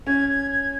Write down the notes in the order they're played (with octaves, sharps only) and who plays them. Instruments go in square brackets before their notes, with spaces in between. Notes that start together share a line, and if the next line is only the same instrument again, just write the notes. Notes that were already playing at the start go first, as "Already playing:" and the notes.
[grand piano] C#4 [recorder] G#6
[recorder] G#6
G#6